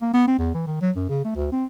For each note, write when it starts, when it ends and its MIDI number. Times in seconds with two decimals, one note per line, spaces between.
0.02 0.13 58
0.14 0.24 59
0.28 0.38 60
0.39 0.54 40
0.54 0.66 52
0.67 0.78 51
0.81 0.91 54
0.96 1.05 42
1.09 1.21 49
1.24 1.34 57
1.36 1.49 38
1.52 1.65 60